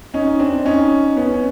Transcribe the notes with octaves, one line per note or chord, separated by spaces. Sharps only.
C#4 D#4
C4 D4
C#4 D#4
B3 C#4
C#4